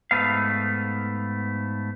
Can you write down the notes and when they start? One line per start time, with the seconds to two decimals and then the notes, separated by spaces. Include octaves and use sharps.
0.11 G#2 A3 B3 F5